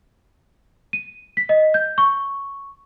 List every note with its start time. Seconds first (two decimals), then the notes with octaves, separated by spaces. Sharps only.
0.93 D#7
1.37 B6
1.49 D#5
1.74 G6
1.98 C#6